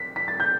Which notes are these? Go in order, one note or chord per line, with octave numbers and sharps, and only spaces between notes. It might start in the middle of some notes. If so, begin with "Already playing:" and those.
Already playing: B6
B6
A6
G6